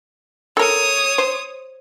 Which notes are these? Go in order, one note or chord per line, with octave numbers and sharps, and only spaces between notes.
A4 A#4 C#5 D#6
C5